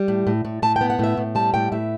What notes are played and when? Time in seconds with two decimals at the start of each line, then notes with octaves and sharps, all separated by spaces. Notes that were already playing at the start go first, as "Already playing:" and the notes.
Already playing: G3
0.08 A2
0.27 A2
0.45 A2
0.62 A2 A5
0.76 B3 G5
0.90 F#5
0.99 A2 E5
1.17 A2
1.35 G3 A5
1.54 A2 G5
1.72 A2 E5